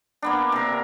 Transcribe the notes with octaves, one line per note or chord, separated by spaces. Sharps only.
A#3 B3 D4
C3 A#4